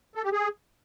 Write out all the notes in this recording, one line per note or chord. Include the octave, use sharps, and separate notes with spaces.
A4
G4
G#4